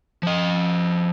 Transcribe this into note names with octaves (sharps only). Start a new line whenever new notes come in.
F3 D#5